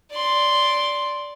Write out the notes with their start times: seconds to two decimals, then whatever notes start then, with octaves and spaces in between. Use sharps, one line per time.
0.11 D5 C6